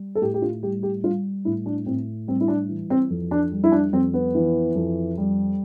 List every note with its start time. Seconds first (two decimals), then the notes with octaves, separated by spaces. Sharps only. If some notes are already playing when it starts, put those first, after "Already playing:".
Already playing: G3
0.15 A4
0.21 A2 G4
0.34 G4
0.42 F4
0.63 G3 G4
0.83 G4
1.04 G3 F4
1.45 A2 E4
1.66 D4
1.86 A2 C4
2.27 G3 C4
2.41 E4
2.48 D4
2.69 E3
2.90 C4
3.10 F2
3.31 D4
3.52 G3
3.64 E4
3.72 D4
3.93 F2 C4
4.14 B3
4.35 E3
4.75 F2
5.18 G3